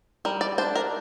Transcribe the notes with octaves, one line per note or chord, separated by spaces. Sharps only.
G3 A#4
D5
D4 C5
A#4